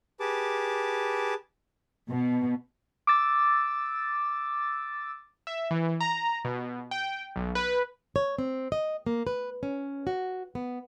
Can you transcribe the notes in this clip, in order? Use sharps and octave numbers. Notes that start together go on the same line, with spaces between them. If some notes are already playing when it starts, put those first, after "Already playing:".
G4 G#4 B4 A5 D6
B2
D6 E6 A6
E5
E3
A#5
B2
G5
B1
B4
C#5
C4
D#5
A#3
B4
C#4
F#4
B3